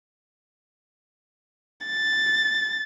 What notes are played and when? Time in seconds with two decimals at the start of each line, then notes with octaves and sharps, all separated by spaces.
1.87 A6